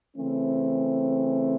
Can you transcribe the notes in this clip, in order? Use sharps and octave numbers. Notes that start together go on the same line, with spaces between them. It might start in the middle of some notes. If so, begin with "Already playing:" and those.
C#3 E3 A3 C4